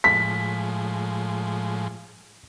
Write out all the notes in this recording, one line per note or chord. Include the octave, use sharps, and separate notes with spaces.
A2 F3 G#3 B6